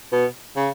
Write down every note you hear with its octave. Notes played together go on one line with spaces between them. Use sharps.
B2
C#3